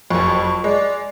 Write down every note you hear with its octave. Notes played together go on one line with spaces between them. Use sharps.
F#1 F2 C#6
G#3 D5